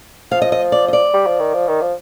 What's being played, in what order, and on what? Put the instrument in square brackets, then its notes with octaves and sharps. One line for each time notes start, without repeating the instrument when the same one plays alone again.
[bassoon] F3 [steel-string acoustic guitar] F5
[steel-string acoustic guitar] D#5
D#5
D5
D#5
D5
[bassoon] G3
F3
D#3
F3
D#3
F3